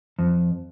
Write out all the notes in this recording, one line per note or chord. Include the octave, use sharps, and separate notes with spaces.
F2